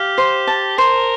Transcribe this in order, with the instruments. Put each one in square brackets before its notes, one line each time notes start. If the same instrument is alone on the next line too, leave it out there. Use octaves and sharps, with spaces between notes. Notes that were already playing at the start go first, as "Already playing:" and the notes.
Already playing: [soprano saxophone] G4 [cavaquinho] F5
[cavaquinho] C5
A5
[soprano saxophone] A#4 [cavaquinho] C5